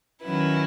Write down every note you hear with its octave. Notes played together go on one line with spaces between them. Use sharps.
D#3 F#3 C#4 E4 B4